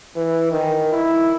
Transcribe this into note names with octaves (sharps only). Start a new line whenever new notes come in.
E3
D#3
E4